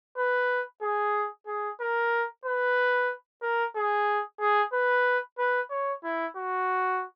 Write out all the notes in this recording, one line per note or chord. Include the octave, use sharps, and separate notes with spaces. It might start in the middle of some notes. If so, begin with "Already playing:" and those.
B4
G#4
G#4
A#4
B4
A#4
G#4
G#4
B4
B4
C#5
E4
F#4